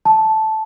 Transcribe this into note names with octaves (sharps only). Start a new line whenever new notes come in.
A5